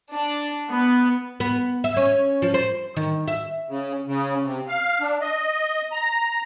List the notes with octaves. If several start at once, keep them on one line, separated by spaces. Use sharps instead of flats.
D4
B3
B3
E5
C#4
F3
C5
D#3
E5
C#3
C#3
C3
F5
D4
D#5
A#5